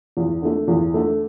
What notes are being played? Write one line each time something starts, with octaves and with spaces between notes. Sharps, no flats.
E2
D3 A3
E2
D3 A3